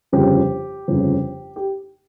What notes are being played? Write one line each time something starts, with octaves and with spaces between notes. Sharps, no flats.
G1 F2 C#3 G4
G1 F2 C#3
G4